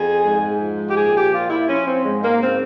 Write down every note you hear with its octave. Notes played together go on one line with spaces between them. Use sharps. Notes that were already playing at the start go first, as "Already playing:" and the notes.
Already playing: F2 G#4
G#2
F3
G4
A#2 G#4
G4
A#2 F4
E4
F3 C#4
C4
G#2 G#3
A#3
C#3 C4